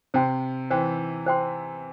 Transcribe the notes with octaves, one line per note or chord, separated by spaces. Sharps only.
C3 C5 G5 C6
E3 C5 G5 C6
C5 G5 C6